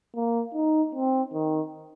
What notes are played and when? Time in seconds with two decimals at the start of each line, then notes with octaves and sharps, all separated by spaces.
0.16 A#3
0.54 D#4
0.95 C4
1.33 D#3